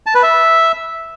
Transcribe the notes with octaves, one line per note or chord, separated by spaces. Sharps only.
A5
B4
E5